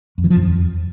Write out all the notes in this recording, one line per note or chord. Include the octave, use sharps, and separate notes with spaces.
F2
E3
F3
F#2
F2